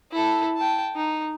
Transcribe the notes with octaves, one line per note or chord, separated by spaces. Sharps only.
E4 A4
G5 A5
D#4